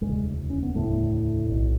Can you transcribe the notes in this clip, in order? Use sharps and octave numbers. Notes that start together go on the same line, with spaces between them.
E1 D2 G#2 C#3 G#3
C#4
B3
E1 D2 A2 C#3 A3
B1 B2